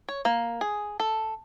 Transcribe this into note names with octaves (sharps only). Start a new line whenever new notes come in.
C#5
A#3
G#4
A4